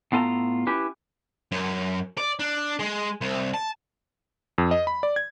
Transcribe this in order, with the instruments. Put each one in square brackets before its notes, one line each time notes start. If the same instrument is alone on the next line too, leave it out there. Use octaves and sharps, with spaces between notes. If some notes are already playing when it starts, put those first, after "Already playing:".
[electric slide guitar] A2 B3 F4 A4 G#5 A#5
C#4 E4 G4 B4
[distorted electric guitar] F#2
D5
D4
G#3
C2
A5
[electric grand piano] F2
D#5
B5
D5
G#6